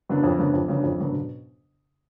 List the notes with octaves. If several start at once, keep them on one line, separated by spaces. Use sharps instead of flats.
C#3 F#3 B3 D4
F2
C#3 F#3 B3 D4
F2
C#3 F#3 B3 D4
F2
C#3 F#3 B3 D4
B2